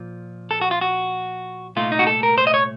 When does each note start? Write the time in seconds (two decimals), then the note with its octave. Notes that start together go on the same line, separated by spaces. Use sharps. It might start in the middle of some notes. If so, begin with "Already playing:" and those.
Already playing: A#2 F3
0.51 A4
0.61 F#4
0.71 F4
0.81 F#4
1.76 C2 A#2 A3 D#4 F4
1.92 D#4
1.99 F#4
2.07 A4
2.23 A#4
2.38 C5
2.47 D#5
2.54 C#5